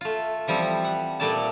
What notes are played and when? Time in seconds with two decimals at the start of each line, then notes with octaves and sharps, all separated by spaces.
0.01 A3 F4
0.48 E3 F3 G3 C4
0.85 F#5
1.20 A#2 G3 A3 D5 A5